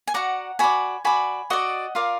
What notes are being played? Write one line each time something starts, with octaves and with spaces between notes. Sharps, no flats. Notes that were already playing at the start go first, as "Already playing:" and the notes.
G#5
F#4 D5 F#5 A#5
F#4 D5 G#5 B5
F#4 D5 G#5 B5
F#4 D5 D#5 F#5
F4 A#4 D5 F5